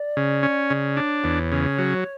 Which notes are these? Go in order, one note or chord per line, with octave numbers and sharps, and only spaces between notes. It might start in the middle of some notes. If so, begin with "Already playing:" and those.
Already playing: D5
C#3
C#4
C#3
D4 C#5
E2
C#3
F#3